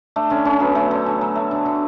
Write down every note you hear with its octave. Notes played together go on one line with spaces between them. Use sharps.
A3 D4
D3 C#4
D3 C#4
F#3 B3
A3 C#4
D3
D3
F#3
A3
D3
D3